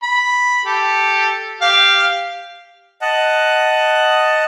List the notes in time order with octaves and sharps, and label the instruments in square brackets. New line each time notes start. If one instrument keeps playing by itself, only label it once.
[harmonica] B5
G4 A4
G4 F5
[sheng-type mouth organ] D#5 F#5 A5 F#6